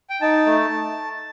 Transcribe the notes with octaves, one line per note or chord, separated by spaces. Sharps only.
G5
D#4 A5
A3